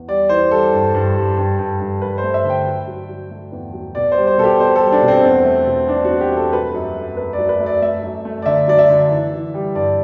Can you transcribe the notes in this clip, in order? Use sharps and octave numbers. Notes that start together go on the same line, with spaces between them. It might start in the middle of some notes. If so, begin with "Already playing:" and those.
Already playing: E2
G3 D5
E3 C5
G3 A4
G2
G2
G3
G2
G2
G2
G2 B4
C5
A3
E5
D3
G5
F#3
F#3
F#3
A3
E2
F#3
B2 D5
C5
G3
C5
B2 A4
G4
B2 C5
A4
G3
D4
B2
C4
E2
A3
B2
E2 D4
F#4
E2
G4
A3
A4
F#3 B4
F#2
A3
A3 B4
D5
F#3
B4
A3
D5
A3 E5
F#2
A3
D5
D3 E5
F#3 D5
E5
D3
E3
E3
G3
G2 D5